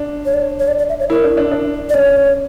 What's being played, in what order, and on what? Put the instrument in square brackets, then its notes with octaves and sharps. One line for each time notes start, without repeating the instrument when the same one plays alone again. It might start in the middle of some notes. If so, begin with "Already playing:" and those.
Already playing: [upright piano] D4
[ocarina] C#5
D5
C#5
C#5
D5
D5
E5
C#5
[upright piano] E4 [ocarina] A#4
[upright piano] D4
D4
D4
[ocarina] D5
[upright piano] C#4 [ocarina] C#5